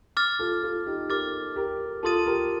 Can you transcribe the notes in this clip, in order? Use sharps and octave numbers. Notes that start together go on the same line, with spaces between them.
D6 F6 A6
F4 A4
F4 A4
D#4 G4
G4 A#4 D6 F6 A6
G4 A#4
F4 A4 A5 C6 D#6 A6 D#7
G4 A#4